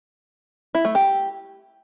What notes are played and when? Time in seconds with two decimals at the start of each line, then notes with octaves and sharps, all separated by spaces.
0.75 E4
0.85 A3
0.95 G4